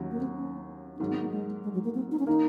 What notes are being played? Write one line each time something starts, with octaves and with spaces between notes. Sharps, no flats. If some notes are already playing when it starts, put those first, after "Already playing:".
Already playing: D#2 D#3 F#3 C#4
A#3
C4
C#4
C#4
G#2 D#3 F#3 D#4
C4
A#3
G#3
G#3
F#3
A#3
C4
D#4
C#4
D#3 A#3 D#4